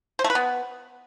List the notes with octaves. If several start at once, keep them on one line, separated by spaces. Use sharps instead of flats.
C5
A3
B4
B3